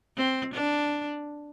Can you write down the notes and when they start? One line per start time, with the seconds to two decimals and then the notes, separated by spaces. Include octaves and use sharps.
0.17 C4
0.53 D4